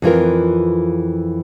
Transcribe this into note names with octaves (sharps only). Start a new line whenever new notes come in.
F2 E3 F4 A#4